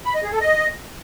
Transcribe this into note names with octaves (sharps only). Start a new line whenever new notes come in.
B5
D#5
G#4
A4
D#5